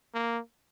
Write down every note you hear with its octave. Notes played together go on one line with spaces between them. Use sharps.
A#3